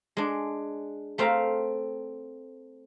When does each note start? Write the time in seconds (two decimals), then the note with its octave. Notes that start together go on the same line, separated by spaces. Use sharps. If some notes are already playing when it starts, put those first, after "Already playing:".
0.17 G#3 D4
1.18 A3 C4 F5 A#5